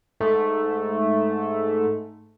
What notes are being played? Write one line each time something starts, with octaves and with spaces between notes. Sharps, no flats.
G#2 A3